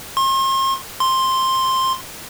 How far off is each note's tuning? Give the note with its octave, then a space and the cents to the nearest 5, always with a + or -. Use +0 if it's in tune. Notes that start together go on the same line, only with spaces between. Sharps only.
C6 +40
C6 +5